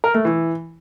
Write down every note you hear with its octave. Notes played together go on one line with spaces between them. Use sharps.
A#4
A3
E3